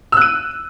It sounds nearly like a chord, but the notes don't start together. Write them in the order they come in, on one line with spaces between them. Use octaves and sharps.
E6 F#6 D#7